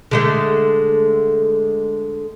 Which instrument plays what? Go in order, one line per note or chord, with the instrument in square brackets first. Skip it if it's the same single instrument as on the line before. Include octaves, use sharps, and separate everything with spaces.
[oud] D3 G#3 A3